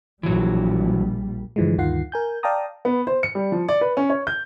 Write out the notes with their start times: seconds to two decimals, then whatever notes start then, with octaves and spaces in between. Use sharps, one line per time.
0.23 A#1 E3 F#3 G3
1.56 G2 D3 E3 F3 G3 G#3
1.78 D2 G2 D#3 F4 F#5 C7
2.12 A#4 G#5 G6
2.43 D5 F5 G5 A5 A#5 D#6
2.85 B3
3.07 C5
3.23 C#7
3.35 G3
3.52 F3
3.69 D5
3.81 B4
3.97 C#4
4.10 C#5
4.27 G6